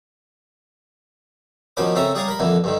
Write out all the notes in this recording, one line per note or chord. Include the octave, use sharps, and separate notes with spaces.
B2 D#3 F3 C#4 B5 D6
C#3 C4 C#4 A4 E5 A#5
G3 G#4 C#5 D5 F5 A#5
A#4 B5
F2 D3 E3 A#3
G2 D3 D#3